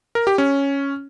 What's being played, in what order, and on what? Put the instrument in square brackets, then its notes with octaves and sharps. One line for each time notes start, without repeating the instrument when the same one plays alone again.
[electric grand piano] A#4
G4
C#4